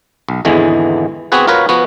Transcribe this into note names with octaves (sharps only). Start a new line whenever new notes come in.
B1
G#1 E2 D3 E3 G#3
B3 C4 F#4 G#4 B4
F4 F#4 A#4 B4 C#5
F3 B3 F#4